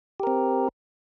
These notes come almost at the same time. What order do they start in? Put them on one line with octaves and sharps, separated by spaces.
G4 A#4 C4